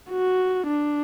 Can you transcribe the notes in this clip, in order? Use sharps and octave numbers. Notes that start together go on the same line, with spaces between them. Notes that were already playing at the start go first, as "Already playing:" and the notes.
F#4
D4